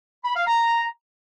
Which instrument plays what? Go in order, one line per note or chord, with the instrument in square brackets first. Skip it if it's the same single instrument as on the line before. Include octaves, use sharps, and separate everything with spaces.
[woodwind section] B5
F5
A#5